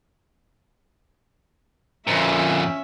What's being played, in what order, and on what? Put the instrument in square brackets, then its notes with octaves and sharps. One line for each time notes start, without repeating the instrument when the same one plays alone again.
[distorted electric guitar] F2 A#2 [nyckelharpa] C#4 E5